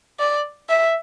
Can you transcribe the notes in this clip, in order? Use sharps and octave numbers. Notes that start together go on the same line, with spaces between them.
D5
E5